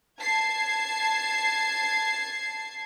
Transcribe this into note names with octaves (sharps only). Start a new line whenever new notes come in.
A5 G#6 C7